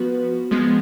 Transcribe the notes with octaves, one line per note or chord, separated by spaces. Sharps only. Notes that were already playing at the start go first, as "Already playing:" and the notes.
Already playing: F3 B3 F#4 B4
F3 G#3 B3